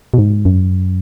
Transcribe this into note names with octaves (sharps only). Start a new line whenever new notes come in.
B2
G#2
F#2